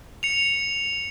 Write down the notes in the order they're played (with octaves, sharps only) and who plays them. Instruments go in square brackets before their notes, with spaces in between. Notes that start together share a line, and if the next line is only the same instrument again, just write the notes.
[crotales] C#7 F7